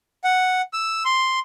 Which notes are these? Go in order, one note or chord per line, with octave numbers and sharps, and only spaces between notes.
F#5
E6
C6